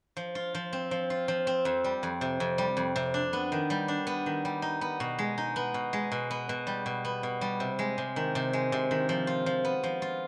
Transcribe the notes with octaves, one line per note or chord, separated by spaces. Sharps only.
F3
F4
F3
C4
F3
F4
F3
C4
F2
G3
F2
C3
F2
G3
F2
C3
D4
B3
D#3
G3
D4
B3
D#3
G3
D#4
B3
B2
G#3
D#4
B3
B2
G#3
B2
B3
B2
G3
B2
B3
B2
G3
C3
G#3
C3
D#3
C3
G#3
C3
D#3
F3
F4
F3
B3
F3
F4